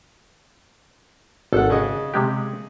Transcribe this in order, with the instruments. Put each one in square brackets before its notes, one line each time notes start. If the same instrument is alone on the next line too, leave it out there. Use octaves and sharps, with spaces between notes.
[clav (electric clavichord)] G#1 [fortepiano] A4 F#5
[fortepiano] C#3 D#5
[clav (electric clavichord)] C3 G#3 G4